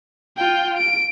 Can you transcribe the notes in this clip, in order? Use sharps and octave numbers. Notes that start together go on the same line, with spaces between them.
F4 G5
D7